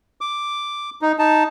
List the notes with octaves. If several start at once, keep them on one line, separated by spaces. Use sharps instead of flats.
D6
D#4
D#4 A5